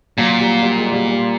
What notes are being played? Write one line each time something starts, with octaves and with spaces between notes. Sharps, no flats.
A#2 F#3
G3
G3
G#3
G3
G3